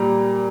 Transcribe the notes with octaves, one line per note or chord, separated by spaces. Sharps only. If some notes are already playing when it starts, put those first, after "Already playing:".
Already playing: A#2 G3 A#5